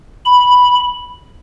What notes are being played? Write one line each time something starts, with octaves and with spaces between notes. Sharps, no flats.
B5